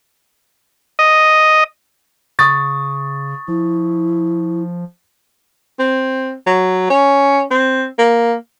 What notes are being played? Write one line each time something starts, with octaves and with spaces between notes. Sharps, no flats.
D#5
C#3 C#6 D#6 A6
F3 E4
C4
F#3
C#4
C4
A#3